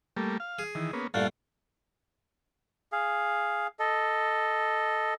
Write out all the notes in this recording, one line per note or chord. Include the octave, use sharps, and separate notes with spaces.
G3 A3 A#3
F5
G#4
D#3 E3
A#3 B3 C#4
G2 A#2 A3 A4 F5 F#5
G#4 F5
A4 D#5